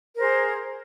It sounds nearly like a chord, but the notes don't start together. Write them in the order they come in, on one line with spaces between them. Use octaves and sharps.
A#4 C5 G#4